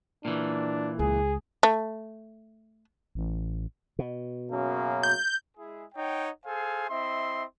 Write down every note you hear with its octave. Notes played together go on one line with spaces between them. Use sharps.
A#2 E3 D4
C#2 G#4
A3
A1
B2
F#2 C#3 A#3
G6
G#3 E4 G#4
D#4 C#5 F#5 G5
G#4 A4 C5 F5 G#5
C4 E4 D#5 E5 C6